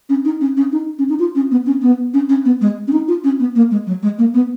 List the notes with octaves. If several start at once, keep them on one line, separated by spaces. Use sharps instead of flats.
C#4
D#4
C#4
C#4
D#4
C#4
D#4
F4
C#4
B3
C#4
B3
C#4
C#4
B3
G#3
C#4
D#4
F4
C#4
B3
A#3
G#3
F#3
G#3
A#3
B3